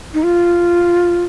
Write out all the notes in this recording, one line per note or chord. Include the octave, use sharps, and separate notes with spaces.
D#4
F4